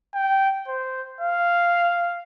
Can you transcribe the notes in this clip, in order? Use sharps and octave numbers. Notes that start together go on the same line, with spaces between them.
G5
C5
F5